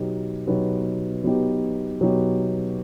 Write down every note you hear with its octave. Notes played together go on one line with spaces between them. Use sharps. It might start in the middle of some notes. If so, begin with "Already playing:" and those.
Already playing: B2 F#3 B3 D#4 G4
B2 F#3 B3 D#4 G4
B2 F#3 B3 D#4 G4
B2 F#3 B3 D#4 G4